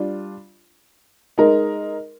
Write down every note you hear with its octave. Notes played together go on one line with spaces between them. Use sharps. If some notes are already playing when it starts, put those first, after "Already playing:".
Already playing: G3 D4 F4
G#3 D#4 A#4